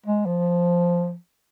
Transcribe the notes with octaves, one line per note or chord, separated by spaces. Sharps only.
G#3
F3